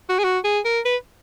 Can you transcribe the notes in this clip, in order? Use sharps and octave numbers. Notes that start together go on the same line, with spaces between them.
F#4
G#4
F#4
G#4
A#4
B4